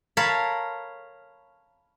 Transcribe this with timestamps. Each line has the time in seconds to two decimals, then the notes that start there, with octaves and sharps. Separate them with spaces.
0.17 A#4 C#5 F5 A5 B5